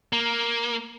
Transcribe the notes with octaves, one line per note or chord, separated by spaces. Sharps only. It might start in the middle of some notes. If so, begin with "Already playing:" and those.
A#3